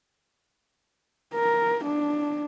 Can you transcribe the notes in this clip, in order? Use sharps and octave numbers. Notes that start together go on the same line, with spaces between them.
A#4
D4